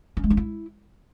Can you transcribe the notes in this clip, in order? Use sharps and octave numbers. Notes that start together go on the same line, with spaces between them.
C#4
G#3
D4
E4